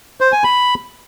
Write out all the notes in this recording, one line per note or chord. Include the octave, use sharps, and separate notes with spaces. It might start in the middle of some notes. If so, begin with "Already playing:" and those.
C5
G#5
B5